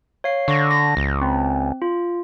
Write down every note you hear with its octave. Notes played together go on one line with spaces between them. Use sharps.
C#5 F5 C7
D3 C#6 A#6
A#6
C#2
C4
F4